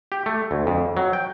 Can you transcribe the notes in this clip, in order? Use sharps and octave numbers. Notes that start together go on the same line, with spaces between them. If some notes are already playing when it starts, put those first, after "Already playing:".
G4
A3
D2
F2
F#3
G5